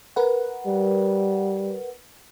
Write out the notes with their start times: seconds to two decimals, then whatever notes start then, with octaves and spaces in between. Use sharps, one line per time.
0.16 A#4 B4 F#5
0.67 G3